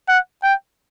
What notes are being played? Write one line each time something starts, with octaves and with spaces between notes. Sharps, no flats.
F#5
G5